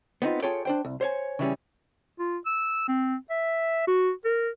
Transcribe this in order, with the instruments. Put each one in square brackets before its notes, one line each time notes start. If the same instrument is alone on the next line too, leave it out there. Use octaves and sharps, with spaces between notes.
[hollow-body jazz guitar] B3 C4 D#4 F4
F4 G#4 A4 C#5 G5
D4 C5 G5
C2
C5 C#5 G#5
C#3 E3 G3 C#4
[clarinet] F4
E6
C4
E5
F#4
A#4